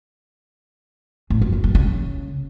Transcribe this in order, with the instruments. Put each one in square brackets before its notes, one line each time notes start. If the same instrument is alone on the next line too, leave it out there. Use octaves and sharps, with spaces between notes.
[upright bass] A2
F#2
G2
F#2
C#3